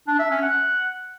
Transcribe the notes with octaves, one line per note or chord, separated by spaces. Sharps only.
D4
E5
C#4
F#5